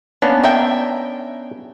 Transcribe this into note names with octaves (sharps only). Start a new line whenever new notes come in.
A#3 B3 C#4 D4
A#4 E5 G5